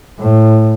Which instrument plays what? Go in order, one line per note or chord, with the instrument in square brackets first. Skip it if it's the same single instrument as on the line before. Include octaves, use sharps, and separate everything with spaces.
[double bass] A2